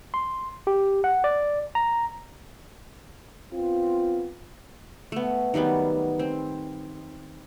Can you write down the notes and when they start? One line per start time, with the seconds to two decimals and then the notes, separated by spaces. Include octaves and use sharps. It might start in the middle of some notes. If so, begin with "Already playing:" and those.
0.14 C6
0.67 G4
1.04 F#5
1.24 D5
1.75 A#5
3.54 B3 C4 F4
5.12 A3 B3
5.54 D#3 F#3 G3 B3
6.19 C4